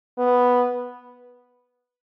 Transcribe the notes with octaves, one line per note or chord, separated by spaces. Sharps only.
B3